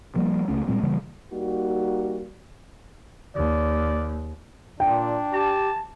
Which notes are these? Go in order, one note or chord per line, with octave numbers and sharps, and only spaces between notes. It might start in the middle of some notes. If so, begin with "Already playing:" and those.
F3 G3 A#3
C#2 A3 C#4
A#2 G3 G#3 C4
C#3 E3 G3 A#3
G3 A#3 D#4 F#4
D#2 D5
A#2 D4 G5
G4 A5